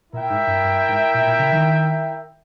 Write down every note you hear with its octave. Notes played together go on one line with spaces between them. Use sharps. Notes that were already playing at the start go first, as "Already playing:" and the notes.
A#2 E4 A#4 E5 G5
G#2
G2
G2
G#2
A#2
A#2
C#3
D#3